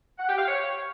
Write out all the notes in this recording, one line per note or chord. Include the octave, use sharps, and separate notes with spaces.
F#5
G4
F5
C#5